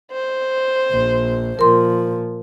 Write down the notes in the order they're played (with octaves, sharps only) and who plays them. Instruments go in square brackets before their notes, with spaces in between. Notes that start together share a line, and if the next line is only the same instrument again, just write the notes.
[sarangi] C5
[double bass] A#1
[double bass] A#2 F3 [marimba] A#4 C6